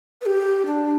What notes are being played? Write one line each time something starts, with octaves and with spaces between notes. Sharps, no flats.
B4
G4
D4